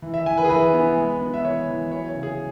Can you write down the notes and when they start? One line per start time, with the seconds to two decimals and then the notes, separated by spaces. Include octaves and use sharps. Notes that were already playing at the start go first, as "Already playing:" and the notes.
0.02 E3
0.14 E5
0.26 E3 G#5
0.38 B4
0.45 G#4
0.49 E3 B4
0.74 B3
0.97 G#3
1.21 B3
1.34 E5
1.44 E3 C#5
1.68 E3
1.92 F#3 C#5
2.08 C#5
2.15 C#3
2.23 G#4